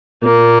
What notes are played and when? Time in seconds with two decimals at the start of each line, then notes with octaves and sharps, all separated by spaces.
0.23 A#2 A#3